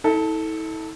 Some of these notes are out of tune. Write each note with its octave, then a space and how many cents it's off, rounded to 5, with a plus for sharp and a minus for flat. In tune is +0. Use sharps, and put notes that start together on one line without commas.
E4 -45 A4 +0